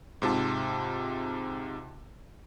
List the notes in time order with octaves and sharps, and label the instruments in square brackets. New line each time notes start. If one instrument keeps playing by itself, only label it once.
[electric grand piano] G#2 C3 F4 A5